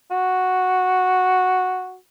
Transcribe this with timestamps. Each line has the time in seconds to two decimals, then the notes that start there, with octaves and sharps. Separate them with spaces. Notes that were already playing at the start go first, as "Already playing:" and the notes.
0.11 F#4